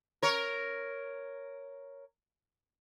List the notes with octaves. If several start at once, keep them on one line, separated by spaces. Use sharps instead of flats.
A#4 C#5